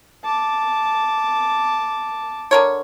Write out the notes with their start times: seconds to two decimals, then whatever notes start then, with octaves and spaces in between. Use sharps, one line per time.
0.25 A5 D6
2.51 D3 A#4 C#5